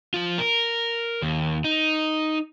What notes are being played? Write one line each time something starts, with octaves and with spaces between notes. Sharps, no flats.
F3 F4
A#4
D#2
D#4